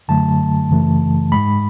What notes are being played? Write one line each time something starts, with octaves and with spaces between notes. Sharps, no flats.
F#2 D3 F#3 A3 A5
F#2 C#3 E3 A3
G#2 G#3 B5